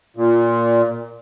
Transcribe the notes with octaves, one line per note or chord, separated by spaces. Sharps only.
A#2